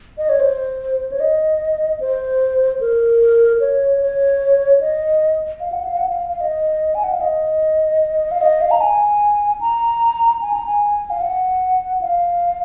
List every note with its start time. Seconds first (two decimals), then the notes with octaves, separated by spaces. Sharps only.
0.18 D#5
0.29 C#5
0.40 C5
1.12 C#5
1.20 D#5
2.00 C5
2.81 A#4
3.60 C#5
4.01 C#5
4.81 D#5
5.60 F5
5.72 F#5
5.85 F5
5.97 F#5
6.09 F5
6.29 F5
6.41 D#5
6.95 G#5
7.04 F#5
7.12 F5
7.21 D#5
8.31 F5
8.41 D#5
8.61 F5
8.71 A#5
8.81 G#5
9.61 A#5
10.42 G#5
10.53 A#5
10.67 G#5
11.10 F5
11.21 F#5
12.01 F5